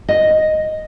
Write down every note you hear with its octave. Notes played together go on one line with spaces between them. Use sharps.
D#5